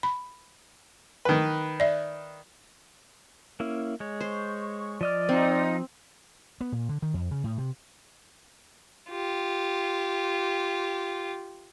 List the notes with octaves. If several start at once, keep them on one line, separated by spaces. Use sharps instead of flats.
B5
D#3 B4
D5 E5
A#3 C#4 E4
G#3 C#5
C5 C#6
F3 D5 D#5 F6
C4 D#4 F4 A#5
B3
A#2
D3
D#3
F2
C#3
A2
C3
F4 G4